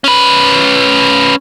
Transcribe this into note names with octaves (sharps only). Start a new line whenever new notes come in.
C#4 B4